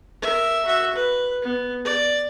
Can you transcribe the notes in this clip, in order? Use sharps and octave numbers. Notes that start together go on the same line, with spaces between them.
A#4 E5
F#4 E5
B4
B3
D5